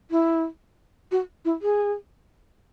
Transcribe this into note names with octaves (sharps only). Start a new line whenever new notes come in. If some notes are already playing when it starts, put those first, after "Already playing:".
E4
F#4
E4
G#4